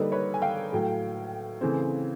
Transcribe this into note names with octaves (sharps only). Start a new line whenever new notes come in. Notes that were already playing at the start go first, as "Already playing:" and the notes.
Already playing: D3 G3 A#3 D#4 A4 B4
B4 C#5
G#5
F5 G5
A2 F#3 A3
C#3 E3 A3 C4